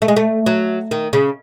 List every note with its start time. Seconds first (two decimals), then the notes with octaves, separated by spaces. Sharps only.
0.02 A3
0.08 G#3
0.16 A3
0.46 F#3
0.91 D#3
1.13 C#3